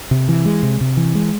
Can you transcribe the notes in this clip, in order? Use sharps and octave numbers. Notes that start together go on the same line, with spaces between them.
C3
E3
G#3
C3
C3
E3
G#3